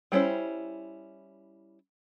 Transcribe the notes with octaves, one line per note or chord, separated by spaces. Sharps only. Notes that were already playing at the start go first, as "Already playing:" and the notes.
G3 A3 C#4 E4 C5